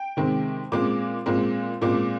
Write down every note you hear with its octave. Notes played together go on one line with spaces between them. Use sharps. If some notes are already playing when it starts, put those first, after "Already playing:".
Already playing: G5
C3 D#3 G#3 C4
A#2 G#3 C4 D6
A#2 G#3 C4
A#2 G#3 C4 D6